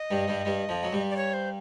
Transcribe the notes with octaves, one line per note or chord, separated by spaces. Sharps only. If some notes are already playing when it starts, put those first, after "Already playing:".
Already playing: D#5
G2 G3
G2 G3
G2 G3
F2 F3
F#3
G2 G3
D5
C#5
C5